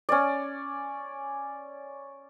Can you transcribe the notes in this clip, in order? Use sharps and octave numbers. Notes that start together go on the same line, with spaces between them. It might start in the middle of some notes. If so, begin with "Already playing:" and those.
C#4 D5